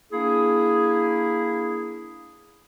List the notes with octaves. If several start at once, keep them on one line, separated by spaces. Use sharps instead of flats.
A#3 D4 E4 G#4